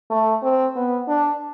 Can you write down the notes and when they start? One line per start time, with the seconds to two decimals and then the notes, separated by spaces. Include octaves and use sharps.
0.10 A3
0.42 C4
0.76 B3
1.08 D4